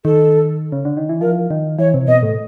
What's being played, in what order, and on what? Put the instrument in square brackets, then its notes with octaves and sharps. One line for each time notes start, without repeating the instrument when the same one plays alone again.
[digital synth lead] D#3 [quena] A4
[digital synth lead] C#3
D3
D#3
E3
[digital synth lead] F3 [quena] A#4
[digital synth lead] D#3
[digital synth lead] E3 [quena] C#5
[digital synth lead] C3
[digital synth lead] B2 [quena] D#5
[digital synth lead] A2